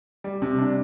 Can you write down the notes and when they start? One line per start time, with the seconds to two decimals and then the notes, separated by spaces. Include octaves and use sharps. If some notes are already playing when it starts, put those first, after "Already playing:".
0.24 G3
0.42 C3
0.58 D4